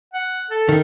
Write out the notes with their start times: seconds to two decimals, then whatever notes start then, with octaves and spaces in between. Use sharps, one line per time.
0.14 F#5
0.50 A4
0.69 D#3